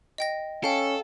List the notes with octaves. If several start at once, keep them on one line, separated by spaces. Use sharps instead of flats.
D#5 G5 A#6
C#4 A4 F5 G5